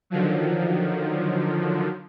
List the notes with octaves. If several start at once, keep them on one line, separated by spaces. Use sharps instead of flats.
D3 D#3 F3 F#3